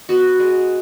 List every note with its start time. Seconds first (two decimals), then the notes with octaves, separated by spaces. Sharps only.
0.09 B3 F#4
0.40 G#3